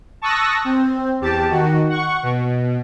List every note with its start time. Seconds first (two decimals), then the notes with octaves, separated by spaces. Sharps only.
0.22 A5 C#6 D#6 E6 F#6 A#6
0.65 C4
1.21 E2 G4 A5
1.50 D#3 F#4
1.89 F#5 C#6
2.23 B2